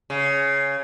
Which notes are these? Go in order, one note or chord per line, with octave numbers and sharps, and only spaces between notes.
C#3